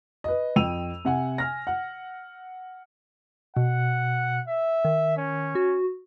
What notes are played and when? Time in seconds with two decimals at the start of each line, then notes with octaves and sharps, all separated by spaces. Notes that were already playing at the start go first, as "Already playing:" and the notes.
0.24 B4 D#5
0.56 F2 G5 E6 D#7 F7
1.05 C3 F#5 G#5
1.38 G#5 F6 A#6
1.67 F#5
3.57 B2 F#5
4.48 E5
4.85 D#3
5.17 C#4
5.55 F#4